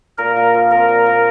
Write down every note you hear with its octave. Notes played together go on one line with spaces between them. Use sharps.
A#2 A#4
A#2
F3
C4 A#4
A#2
A#2